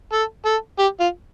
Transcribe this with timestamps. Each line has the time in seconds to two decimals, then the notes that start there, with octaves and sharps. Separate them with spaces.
0.12 A4
0.45 A4
0.79 G4
1.00 F4